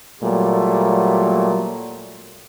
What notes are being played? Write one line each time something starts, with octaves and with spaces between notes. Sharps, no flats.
A#2 F#3 G3 A3